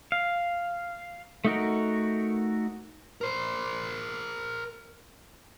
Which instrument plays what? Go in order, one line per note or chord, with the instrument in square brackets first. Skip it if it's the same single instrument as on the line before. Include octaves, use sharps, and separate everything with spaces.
[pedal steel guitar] F5
A3 D#4 F#4 A#4
[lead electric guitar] A#4 C5